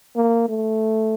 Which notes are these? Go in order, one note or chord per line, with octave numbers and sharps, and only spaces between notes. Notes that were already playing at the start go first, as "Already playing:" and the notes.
A#3
A3